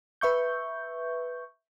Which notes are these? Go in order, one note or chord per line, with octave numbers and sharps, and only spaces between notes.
B4 E5 C#6 G6